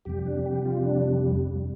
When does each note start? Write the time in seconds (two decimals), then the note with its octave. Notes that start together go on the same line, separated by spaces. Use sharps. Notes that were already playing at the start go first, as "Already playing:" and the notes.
0.05 F2 C3 G3 G4
0.26 D4
0.46 G4
0.65 F4
0.84 D4